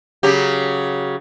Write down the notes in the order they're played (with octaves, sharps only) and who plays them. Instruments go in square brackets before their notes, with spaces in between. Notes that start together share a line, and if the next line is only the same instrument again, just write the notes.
[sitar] C#3 F#3 G4